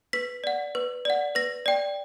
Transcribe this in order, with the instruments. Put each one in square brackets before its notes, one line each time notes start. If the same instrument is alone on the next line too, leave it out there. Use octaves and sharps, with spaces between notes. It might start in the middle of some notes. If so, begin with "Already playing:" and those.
[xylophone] B4 B6
D5 F#5
B4
D5 F#5
B4 A#6
D5 G5